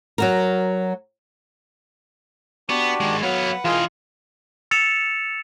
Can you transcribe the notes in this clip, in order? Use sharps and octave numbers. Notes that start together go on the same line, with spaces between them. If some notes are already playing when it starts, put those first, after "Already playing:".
F#3 F#4 A#4
B3 D4 F#4 G4
D#3 G#3
F#3 B3 B4 F5 F#5
E3 F4 G#4 A#4 D#5 G5
E6 A6 C#7 E7 F7